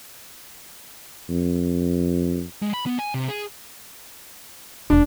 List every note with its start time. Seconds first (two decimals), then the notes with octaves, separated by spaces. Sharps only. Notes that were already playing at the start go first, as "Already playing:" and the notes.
1.29 F2
2.62 G#3
2.74 B5
2.87 B3
2.99 G#5
3.14 C3
3.29 G#4
4.90 E1 D4